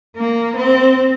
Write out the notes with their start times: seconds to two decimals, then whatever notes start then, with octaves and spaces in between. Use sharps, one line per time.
0.17 A#3
0.56 C4